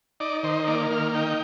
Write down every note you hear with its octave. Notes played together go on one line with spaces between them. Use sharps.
D#4 D5
D#3 C5
A#3 D5
D#3 F5
D#4 G5